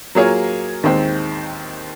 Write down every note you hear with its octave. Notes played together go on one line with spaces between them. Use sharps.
F#3 A#3 F4 G#4 C#5
D#2 D#3 G#3 C4